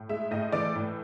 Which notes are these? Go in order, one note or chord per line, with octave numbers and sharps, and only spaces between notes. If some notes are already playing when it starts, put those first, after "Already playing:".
Already playing: A2
G#3 E5
A2 D#5
E3 D5
A2